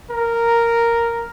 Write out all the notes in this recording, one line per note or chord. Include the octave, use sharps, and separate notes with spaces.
A#4